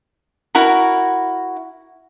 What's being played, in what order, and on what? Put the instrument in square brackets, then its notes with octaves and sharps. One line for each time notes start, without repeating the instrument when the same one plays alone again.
[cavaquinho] E4 F#4 A#4 A#5